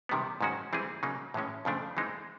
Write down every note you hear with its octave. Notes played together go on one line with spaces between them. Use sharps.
C3 D#3 G3 B3
G#2 D#3 G#3 C#4 F#4
E3 G3 C4 E4 G#4
C#3 F#3 A#3 D#4
A2 E3 G#3 C#4
F2 C#3 F3 A3 D4
E3 G#3 C4 D#4